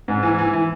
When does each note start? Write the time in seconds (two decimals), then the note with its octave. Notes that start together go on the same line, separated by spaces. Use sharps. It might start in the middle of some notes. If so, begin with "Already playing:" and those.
0.08 G#2
0.23 E3
0.38 E3
0.53 E3